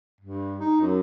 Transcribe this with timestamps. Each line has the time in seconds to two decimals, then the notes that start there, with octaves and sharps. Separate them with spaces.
0.21 G2
0.60 D#4
0.81 F#2